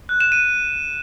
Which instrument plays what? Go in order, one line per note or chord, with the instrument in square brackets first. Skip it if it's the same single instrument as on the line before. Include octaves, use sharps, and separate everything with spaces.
[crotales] F#6
E7
D#7